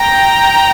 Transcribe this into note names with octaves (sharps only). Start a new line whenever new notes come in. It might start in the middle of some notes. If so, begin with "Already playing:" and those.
Already playing: G5 A#5